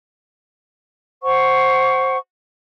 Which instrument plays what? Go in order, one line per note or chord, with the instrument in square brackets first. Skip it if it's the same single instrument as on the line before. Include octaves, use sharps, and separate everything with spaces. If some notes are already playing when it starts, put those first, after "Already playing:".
[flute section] C5 F#5 C#6